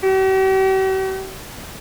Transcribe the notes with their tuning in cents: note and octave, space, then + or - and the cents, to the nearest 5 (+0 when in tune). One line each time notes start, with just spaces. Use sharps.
G4 -45